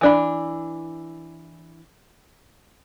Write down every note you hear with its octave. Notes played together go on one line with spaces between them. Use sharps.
E3 D4 B5